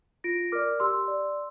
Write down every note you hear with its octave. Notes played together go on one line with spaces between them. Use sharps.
F4 A#6 D7
A#4 D5 D6 F6
G4 C6 E6
D5